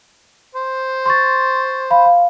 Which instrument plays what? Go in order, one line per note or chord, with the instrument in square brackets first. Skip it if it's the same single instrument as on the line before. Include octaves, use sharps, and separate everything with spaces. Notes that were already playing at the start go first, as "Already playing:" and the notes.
[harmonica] C5
[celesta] C6 C#6 A6
F5 B5
F5